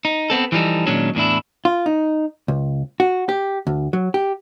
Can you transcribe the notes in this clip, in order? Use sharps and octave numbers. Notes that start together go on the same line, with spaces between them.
D#4
B3 C4 A4
E3 F3 G3 D#4 A4
A#2 D#3 F#3 G#3 C#4 D4
E2 A2 D4 E4
F4
D#4
C#2
F#4
G4
D2
F#3
G4